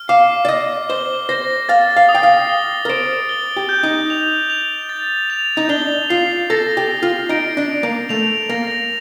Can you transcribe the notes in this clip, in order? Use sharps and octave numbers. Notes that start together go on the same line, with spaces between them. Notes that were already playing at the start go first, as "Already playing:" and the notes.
Already playing: F6
F5 D6
D5
D#5 D6
C5 G7
C5 A#6
F5 A6
F5
D#6
G5
F5
G7
A#4
C5 D7
G7
G4
G6
D#4
F7
F7
A6
F7
D#4
D4 G7
F4 C7
A4 A#6
G4
A#6
F4
D#4 D7
D4
D7
A#3
A3 F7
A#3 A#6